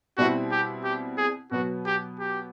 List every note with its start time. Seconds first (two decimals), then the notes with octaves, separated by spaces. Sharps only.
0.18 B2 G3 C4 E4 F#4
0.52 G4
0.84 G4
1.18 G#4
1.51 B2 F#3 B3 F#4
1.86 G4
2.20 G4